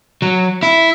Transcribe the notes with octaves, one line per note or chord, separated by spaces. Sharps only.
F#3
E4